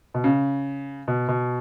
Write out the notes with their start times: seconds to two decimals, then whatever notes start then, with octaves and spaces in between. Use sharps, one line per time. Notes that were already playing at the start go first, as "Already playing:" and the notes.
0.14 B2
0.24 C#3
1.08 B2
1.28 B2